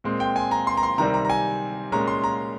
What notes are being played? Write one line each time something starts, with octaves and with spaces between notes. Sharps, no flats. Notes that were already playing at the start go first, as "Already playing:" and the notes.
A#2 G#3 C4
G5
G#5
A#5
C6
A#5
C6
C3 D#3 G3 C4 A#5
A#5
A#5
G#5
A#2 G#3 C#4 A#5
C6
A#5